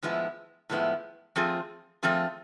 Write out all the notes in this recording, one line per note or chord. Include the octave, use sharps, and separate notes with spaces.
A2 F3 G#3 B3 E4
A2 F3 G#3 B3 E4
F3 A3 C4 F4 G#4
F3 A3 C4 F4 G#4